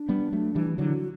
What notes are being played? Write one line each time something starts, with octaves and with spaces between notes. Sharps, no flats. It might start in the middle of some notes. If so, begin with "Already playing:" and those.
Already playing: D4
G3 B3
F#3 A3
E3 G3
D3 F#3 E4
F#4